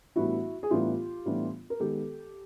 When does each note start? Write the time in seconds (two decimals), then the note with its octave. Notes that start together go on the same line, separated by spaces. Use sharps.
0.16 A2 E3 G3 B3 D4 E4 F#4
0.63 G#4
0.70 A2 E3 G3 B3 D4 F4 G4
1.25 A2 E3 G3 B3 D4
1.70 A#4
1.80 D#3 G#3 B3 G4 A4